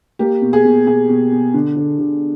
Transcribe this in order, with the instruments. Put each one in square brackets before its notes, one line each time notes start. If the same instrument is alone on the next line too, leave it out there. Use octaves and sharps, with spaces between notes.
[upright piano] A#3 G4
B2
G#4
B2
B2 G#4
B2
B2
D3
D3
D3